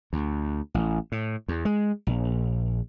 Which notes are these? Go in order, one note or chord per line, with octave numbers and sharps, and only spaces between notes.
D2
A1
A2
E2
G#3
A#1